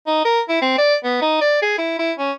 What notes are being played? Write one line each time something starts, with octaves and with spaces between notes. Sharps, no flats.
D#4
A#4
E4
C4
D5
B3
D#4
D5
G#4
E4
E4
C#4